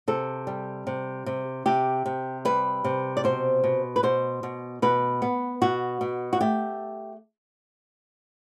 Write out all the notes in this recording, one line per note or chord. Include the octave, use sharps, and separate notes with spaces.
C3 A4
G3
C3
C3
C3 G4
C3
G3 B4
C3
D5
B2 C5
B2
B4
B2 C5
B2
B2 B4
B3
B2 F#4
B2
F#4
A3 G4